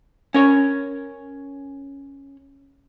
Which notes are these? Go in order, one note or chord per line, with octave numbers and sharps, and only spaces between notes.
C#4 A#4 C#5